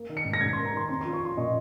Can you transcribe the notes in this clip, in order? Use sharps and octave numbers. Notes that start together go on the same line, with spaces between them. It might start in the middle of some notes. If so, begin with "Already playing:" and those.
Already playing: A#3
D#3
C#7
G#2
A#6
G#2 G#6
C6
A#3
A#5
D#3 C6
C4 C6
F3 C6
C#6
F4 C6
A#2 D#5